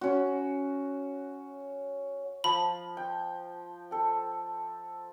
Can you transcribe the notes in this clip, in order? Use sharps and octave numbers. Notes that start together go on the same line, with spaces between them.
C#4 F#4
F3 B5
G5
A4 G5